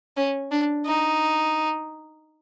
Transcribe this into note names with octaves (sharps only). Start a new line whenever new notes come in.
C#4
D4
D#4